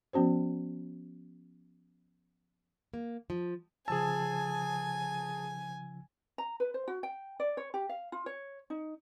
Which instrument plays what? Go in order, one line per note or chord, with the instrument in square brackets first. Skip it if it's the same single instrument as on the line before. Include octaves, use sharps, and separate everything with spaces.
[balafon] F3 B3 C#4 F#4 C5
[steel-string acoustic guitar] A#3
F3
[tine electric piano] C#3 F3 E6 [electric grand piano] G#4 A5 [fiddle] G#5
[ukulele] A#5
B4
C5
F#4
G5
D5
C#5
G4
F5
F4
C#5
D#4